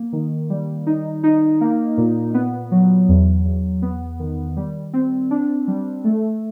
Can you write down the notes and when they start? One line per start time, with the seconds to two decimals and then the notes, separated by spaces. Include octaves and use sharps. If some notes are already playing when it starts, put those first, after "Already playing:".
Already playing: A#3
0.13 D#3
0.50 G3
0.87 D#4
1.24 D#4
1.61 A#3
1.97 A#2
2.34 B3
2.71 F#3
3.09 E2
3.45 E2
3.82 B3
4.19 D#3
4.57 G3
4.93 C4
5.31 D4
5.67 G3
6.04 A3